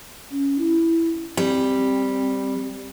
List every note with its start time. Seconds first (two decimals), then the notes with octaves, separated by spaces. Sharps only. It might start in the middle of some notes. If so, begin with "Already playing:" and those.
0.31 C#4
0.58 E4
1.37 G3 C4